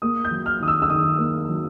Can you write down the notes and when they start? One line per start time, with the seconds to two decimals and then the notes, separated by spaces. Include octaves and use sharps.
0.02 A#3 D#6
0.25 G6
0.31 F#3
0.46 F6
0.60 D#3 D#6
0.68 E6
0.82 E6
0.90 D#3 D#6
1.19 A#3
1.49 F#3